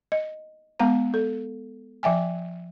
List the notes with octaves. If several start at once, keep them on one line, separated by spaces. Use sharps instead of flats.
D#5
G#3 B3 F5 A#5
A4
F3 E5 G5 G#5